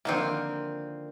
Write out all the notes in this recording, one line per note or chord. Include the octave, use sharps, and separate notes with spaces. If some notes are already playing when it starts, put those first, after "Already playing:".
D3 D#3 F3 A#3 C4